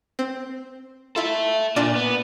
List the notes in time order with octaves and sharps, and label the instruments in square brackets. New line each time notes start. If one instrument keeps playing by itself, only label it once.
[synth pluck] C4
[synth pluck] E4 F4 [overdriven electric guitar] A4 E5
[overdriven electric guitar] A#2 [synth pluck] D4 F4 D5
[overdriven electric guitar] B3